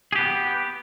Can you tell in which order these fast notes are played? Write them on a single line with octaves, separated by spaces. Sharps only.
G#4 G4 B3